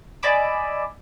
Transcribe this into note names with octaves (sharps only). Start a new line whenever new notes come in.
D5 D#5 G#5 B5 D6 E6